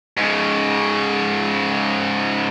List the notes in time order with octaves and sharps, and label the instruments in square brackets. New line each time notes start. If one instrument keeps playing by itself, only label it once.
[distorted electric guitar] G#2 C#3